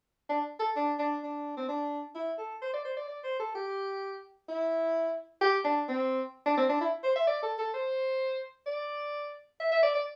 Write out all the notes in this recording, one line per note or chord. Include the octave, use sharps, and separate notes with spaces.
D4
A4
D4
D4
D4
C4
D4
E4
A4
C5
D5
C5
D5
D5
C5
A4
G4
E4
G4
D4
C4
D4
C4
D4
E4
C5
E5
D5
A4
A4
C5
D5
E5
E5
D5
D5